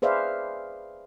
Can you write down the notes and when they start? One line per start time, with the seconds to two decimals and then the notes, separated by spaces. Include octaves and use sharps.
0.02 G#4 B4 C5 D5 E5 F5